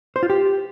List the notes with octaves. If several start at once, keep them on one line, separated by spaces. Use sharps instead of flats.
C5
F4
G4